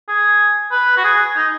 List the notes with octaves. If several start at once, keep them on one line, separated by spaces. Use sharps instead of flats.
G#4
B4
F#4
G#4
D#4